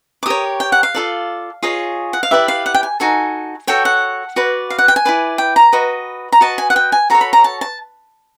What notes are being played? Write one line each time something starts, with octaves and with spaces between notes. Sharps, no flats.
D6
G4 A#4 C#5 D#6
G5
F#5
F5
F4 A4 D5
F4 G#4 C#5 D#5
F#5
F5
E4 G4 B4 D5 E5
F5
F#5
G5
G#5
D#4 F#4 A4 G#5
F#4 A4 C#5 G5
F#5
F#4 B4 D5
F5
F#5
G5
G#5
E4 G4 B4 D5
G5
A#5
F#4 B4 D#5
A#5
F#4 B4 D#5 A5
G#5
F#5
G5
G#5
F#4 A4 C#5 A#5
B5
A#5
A5
A5